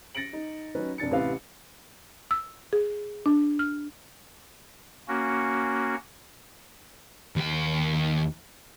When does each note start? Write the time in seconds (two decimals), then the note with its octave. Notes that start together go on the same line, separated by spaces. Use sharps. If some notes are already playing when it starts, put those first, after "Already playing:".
0.15 A6 A#6 C#7 D7 F#7
0.33 D#4
0.75 F#3 C#4 D#4 B4
0.98 F1 D4 A6 C#7
1.11 A1 C3 E4 B4 F5
2.31 E6
2.73 G#4
3.26 D4
3.59 F6
5.08 A#3 C#4 F#4
7.36 D#2 G5